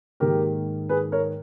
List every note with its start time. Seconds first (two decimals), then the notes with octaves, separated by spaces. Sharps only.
0.20 G#2 D#3 A#3 G4 A#4
0.89 G#4 B4
1.12 A#4 C#5